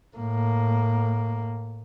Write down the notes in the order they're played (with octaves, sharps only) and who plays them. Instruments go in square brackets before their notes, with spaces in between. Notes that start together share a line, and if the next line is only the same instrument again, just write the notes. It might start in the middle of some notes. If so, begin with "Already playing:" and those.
[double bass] A2 A#3